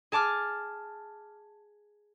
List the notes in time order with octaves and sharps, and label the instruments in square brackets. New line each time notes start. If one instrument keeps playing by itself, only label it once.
[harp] G#4 A5 D6 F6